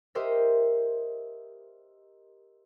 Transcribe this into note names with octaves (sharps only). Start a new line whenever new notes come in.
G4 A#4 C5 D#5 E5